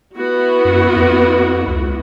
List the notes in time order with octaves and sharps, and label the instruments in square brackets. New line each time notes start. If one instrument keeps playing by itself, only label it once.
[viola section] B3 E4 F#4
[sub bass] F#2
F2
C#2